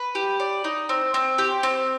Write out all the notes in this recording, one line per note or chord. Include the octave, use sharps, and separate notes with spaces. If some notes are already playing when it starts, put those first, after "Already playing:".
Already playing: B4
G4
D5
D#4
C4
C4
G4
C4